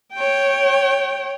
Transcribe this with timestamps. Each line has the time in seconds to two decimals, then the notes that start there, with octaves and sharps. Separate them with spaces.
0.15 C#5 G5